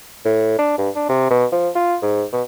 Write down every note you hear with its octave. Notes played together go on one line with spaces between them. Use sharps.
A2
D4
G2
D4
C3
B2
F3
F4
G#2
B2